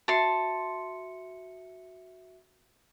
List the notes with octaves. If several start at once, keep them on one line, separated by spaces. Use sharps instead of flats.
F#4 E5 A5 C6 C#7